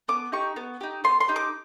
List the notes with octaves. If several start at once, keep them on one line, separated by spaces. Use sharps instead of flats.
B3 D6
D#4 G4 C#6
B3
D#4 G4
B3 C6
C6
D#4 G4
D6